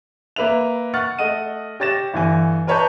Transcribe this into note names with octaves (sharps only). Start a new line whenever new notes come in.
A#3 B4 E5 F7
F#5 C#6 F6 A6
A3 D#5 F#5 D#7
G4 C#5 A6 A#6 E7
G1 E3 G#5
A#4 B4 C#5 D5 A5 G6